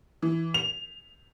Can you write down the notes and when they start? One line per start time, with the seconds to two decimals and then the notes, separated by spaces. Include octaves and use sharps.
0.22 E3
0.54 F7